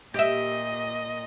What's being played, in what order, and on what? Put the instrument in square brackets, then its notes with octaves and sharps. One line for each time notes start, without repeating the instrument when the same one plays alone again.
[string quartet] A#2 D#5 [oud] G4 E5